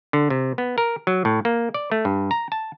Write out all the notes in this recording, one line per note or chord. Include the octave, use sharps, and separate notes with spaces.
D3
C3
B3
A#4
F#3
A2
A#3
D5
A3
G2
A#5
A5